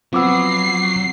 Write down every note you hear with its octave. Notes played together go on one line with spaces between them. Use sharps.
F3 F#3 B3 C4 D6 E6 C7